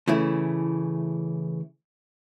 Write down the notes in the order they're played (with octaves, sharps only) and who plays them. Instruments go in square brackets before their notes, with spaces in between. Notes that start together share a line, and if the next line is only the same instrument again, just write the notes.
[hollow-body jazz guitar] C#3 E3 A3 E4